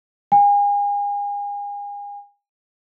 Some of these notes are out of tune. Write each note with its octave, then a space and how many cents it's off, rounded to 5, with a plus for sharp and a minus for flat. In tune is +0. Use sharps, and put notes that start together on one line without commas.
G#5 -35